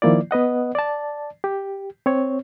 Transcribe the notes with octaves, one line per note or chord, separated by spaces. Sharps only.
D#3 F3 A#3 E4 D5
B3 B4 D#5 F#5
D5 A5
G4
C4 C#5